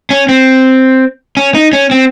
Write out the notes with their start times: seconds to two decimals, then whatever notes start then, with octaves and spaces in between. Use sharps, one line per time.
0.11 C#4
0.29 C4
1.37 C#4
1.55 D#4
1.73 C#4
1.91 C4